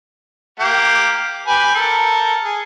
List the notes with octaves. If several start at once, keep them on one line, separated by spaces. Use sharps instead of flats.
A#3 G4
G4 B4 G#5
A4 A#4
G#4